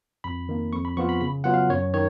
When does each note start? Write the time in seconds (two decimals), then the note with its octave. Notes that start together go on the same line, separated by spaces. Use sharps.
0.24 F2 B5
0.49 D#3 A#3
0.72 F2 C#6
0.85 B5
0.97 F3 B3 F4 C#6
1.09 B5
1.21 C#3 B5
1.44 F#3 B3 F4 F#5
1.54 F5
1.70 F#2 C#5
1.94 D#3 C#5